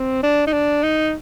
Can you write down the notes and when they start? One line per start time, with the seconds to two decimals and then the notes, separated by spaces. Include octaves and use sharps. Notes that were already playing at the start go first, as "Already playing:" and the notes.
Already playing: C4
0.23 D4
0.47 D#4
0.53 D4
0.83 D#4